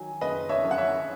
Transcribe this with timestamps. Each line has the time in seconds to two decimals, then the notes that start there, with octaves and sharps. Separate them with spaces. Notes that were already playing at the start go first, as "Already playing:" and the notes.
Already playing: D#3 F#3 G#5
0.21 F#1 B4 D#5
0.49 C#5 E5
0.64 F#2
0.71 F#5
0.78 C#5 E5